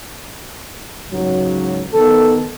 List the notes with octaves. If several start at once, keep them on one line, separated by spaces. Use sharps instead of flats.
C#2 G#2 F#3
D#3 B3 A4